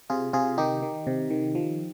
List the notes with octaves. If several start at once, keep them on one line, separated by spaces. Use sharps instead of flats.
C3 F4 G#4
C3 F4 G#4
D#3 D#4 G4
D#3
C3
D#3
F3